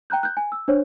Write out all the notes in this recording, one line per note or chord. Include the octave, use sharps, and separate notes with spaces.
G5 A#5 F#6 G6
F#6 G6
G#5
E6
D4 C5 C#5